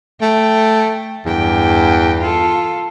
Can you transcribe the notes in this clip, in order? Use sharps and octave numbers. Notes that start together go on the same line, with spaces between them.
A3 G5
E2 G2 G5
F4 A4